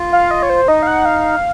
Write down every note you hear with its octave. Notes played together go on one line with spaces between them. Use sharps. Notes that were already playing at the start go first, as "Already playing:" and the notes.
Already playing: F4
F5
D#5
C#5
C5
D#4 D#5
F5
F#5
F5